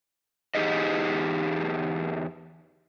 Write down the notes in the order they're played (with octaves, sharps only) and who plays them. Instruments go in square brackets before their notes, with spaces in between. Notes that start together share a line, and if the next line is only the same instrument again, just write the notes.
[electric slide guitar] E2 D#4 G4 G#4 D#5